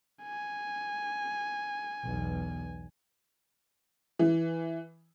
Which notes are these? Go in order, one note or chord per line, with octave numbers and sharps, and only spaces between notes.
G#5
B1 E2
E3